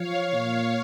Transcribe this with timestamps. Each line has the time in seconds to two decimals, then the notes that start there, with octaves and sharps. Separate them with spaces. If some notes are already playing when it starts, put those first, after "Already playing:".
Already playing: F3 C#5 F5
0.34 A#2